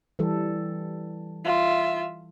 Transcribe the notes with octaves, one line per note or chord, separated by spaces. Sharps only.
E3 G3 A4
F4 E5